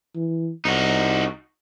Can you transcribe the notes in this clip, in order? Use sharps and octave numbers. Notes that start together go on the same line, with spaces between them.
E3
C2 D#4 F#4